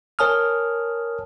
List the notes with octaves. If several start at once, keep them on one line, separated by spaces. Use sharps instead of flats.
A#4 C#5 G#5 A5 D#6 F6